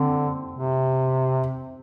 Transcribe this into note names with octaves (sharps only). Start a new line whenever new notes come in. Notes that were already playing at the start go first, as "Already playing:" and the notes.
Already playing: D3 C4
C3